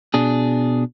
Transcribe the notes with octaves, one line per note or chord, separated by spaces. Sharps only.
B2 D4 G#4